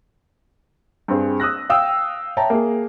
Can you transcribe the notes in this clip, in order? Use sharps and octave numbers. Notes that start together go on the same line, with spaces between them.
G2 C4 G#4
D#6 E6 F#6 A#6
F5 G5 D#6 E6
C#5 E5 G5 A5 A#5
A#3 G#4